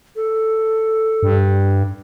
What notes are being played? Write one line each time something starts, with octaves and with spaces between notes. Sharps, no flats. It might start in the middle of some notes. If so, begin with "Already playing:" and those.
A4
G2